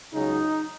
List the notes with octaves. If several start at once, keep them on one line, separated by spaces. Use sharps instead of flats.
C#2 C#3 F#3 D#4